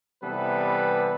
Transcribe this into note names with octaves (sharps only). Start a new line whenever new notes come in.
C3 E3 G3 B3 A4 B4